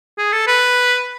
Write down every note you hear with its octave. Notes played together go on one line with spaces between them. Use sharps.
G#4
A4
B4